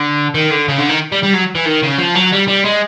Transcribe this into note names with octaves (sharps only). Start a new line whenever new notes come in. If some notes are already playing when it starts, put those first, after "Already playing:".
Already playing: D3
D#3
D3
C#3
D3
D#3
G3
G3
F#3
E3
D#3
C#3
F3
F#3
G3
G3
G#3